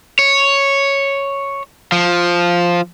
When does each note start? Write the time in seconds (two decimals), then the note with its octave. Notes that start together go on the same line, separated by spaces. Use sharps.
0.19 C#5
1.92 F3